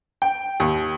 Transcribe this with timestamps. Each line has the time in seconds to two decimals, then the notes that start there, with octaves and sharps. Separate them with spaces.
0.22 G5
0.60 D#2